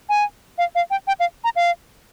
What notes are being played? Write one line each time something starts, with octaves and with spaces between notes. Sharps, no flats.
G#5
F5
F5
G5
G5
F5
A#5
F5